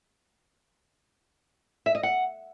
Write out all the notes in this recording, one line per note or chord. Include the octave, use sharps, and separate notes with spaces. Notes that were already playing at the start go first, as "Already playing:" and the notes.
E5
D#5
F#5